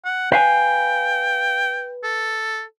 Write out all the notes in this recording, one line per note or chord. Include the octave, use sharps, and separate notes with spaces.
F#5
B4 F5 G5 G#5
A4